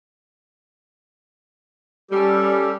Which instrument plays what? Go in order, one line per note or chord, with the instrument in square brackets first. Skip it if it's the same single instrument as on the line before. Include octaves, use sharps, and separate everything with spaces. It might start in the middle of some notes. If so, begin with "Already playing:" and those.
[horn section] G3 [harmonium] C#4 G4 A4